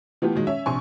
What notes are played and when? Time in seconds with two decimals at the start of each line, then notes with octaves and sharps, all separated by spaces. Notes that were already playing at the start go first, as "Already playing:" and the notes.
0.22 E3 A3 B3 F4 G4
0.35 A#2 D#3 F#3 G#3
0.47 C#4 E5
0.66 A#1 C3 G#5 C6 C#6